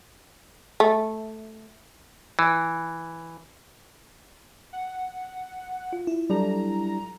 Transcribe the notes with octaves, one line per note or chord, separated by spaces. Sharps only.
A3
E3
F#5
F4
E4
F#3 G3 D4 A4 A#5